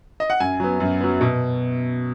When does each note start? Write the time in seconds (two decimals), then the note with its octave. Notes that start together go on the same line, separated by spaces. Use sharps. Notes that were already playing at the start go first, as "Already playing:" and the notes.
0.20 D#5
0.30 F#5
0.40 F#2 G#5
0.60 F#3 B3
0.80 F#2
1.01 F#3 B3
1.21 B2